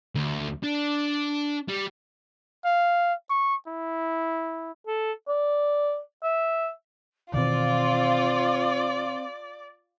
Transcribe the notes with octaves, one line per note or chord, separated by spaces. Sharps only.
D2
D4
G3
F5
C#6
E4
A4
D5
E5
B2 D#3 E3 C4 F4 D5